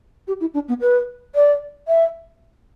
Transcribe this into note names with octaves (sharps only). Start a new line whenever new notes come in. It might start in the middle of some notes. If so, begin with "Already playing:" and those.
G4
E4
D4
B3
B4
D5
E5